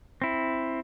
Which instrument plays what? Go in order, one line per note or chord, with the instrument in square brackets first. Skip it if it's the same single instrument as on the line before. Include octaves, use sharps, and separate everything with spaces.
[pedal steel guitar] C4 E4